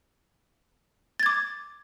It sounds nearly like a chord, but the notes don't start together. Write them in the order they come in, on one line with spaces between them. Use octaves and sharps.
A6 G#6 D6